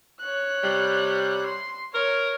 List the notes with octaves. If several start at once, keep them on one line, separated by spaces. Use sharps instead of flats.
C#5 F#6
C3 G3
C6
A#4 C#5